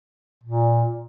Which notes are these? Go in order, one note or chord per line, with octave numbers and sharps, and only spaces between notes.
A#2